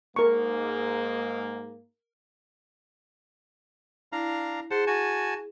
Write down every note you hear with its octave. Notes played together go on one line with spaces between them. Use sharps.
G#2 A#3 A#4 C#6
D4 E4 F5 A#5
G#4 C5 F#5 A5
F#4 G#5 A5